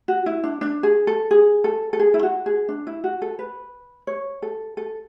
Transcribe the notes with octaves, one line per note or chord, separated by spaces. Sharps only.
F#4
E4
D4
D4
G#4
A4
G#4
A4
A4
G#4
E4
F#4
G#4
D4
E4
F#4
A4
B4
C#5
A4
A4